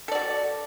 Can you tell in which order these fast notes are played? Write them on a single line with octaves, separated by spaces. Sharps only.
A4 D5 F#4